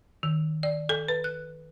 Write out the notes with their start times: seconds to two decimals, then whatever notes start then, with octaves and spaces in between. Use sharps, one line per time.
0.23 D#3
0.63 D5
0.89 A4
1.08 B4
1.24 F#6